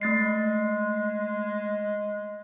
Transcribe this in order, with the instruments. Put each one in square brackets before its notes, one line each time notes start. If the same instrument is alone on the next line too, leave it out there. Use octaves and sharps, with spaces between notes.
[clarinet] G#3 [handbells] A3 A6 C7